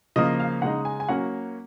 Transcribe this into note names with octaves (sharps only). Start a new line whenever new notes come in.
C#3 F3 A#3 D#5
F5
C#3 G#3 D#4 F#5
G#5
G#5
F#3 A#3 C#4 F#5